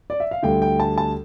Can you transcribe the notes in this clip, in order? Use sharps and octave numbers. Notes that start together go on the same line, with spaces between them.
D5
E5
F5
D2 D3 G3 G5
G5
A5
A5